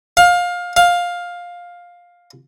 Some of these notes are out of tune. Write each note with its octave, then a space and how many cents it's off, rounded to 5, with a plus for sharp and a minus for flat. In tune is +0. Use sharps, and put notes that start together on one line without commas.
F5 +20
F5 +10